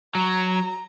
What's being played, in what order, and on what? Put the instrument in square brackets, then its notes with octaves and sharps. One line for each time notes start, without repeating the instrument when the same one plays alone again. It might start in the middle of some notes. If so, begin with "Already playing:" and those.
[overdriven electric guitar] F#3 [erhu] A#5